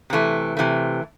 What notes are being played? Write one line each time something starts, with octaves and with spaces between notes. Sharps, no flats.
C3 E3 A3
C3 E3 A3